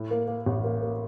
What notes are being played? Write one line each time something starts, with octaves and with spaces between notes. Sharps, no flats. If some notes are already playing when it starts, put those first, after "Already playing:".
Already playing: A2
A#3
A#3
A1
A#3
A#3